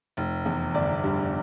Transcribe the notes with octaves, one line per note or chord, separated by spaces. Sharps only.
F1
E2
G1 D5
G2